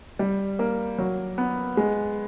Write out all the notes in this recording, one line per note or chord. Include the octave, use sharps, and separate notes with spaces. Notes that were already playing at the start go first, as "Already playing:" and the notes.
G3
A#3
F#3
B3
G#3